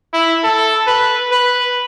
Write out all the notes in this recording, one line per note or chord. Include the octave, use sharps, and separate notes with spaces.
E4
A4
B4
B4